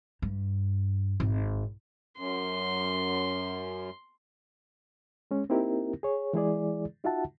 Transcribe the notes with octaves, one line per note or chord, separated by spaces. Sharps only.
G2
G#1
F#2 C6
G#3 C#4
A#3 C4 D#4 E4 G4 A#4
G#4 C#5
E3 G#3 E4 G#4 D5
D#4 F4 F#4 E5 F#5 A5